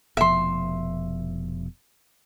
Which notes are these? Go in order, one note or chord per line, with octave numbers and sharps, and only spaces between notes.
F1 B2 F3 E5 C6